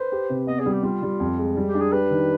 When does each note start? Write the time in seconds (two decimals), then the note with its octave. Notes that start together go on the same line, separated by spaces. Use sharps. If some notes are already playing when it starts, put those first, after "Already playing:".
Already playing: B4 C5
0.12 G4
0.30 C3
0.47 B3 D#5
0.60 G#4
0.66 G3
0.72 G4
0.83 G3 F4
1.03 G3
1.20 F2
1.38 G#3
1.57 G3
1.68 G4
1.75 D4
1.80 G#4
1.92 G4 B4
2.10 D#3